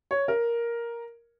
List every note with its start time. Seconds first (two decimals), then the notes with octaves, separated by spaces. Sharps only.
0.11 C#5
0.28 A#4